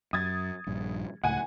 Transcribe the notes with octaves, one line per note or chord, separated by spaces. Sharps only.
F#2 D#6 G#6 A6
A#1 G2
C#2 A2 F#5 G#5